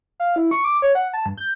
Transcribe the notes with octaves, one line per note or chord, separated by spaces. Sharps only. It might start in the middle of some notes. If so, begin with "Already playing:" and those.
F5
E4
C#6
D6
C#5
F#5
A5
G2
G6